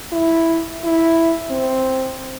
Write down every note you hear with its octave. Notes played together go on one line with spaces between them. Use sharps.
E4
E4
C4